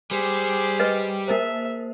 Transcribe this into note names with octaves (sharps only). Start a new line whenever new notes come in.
G3 G#4 C5
B4 D#5
A#3 A#4 C5 E5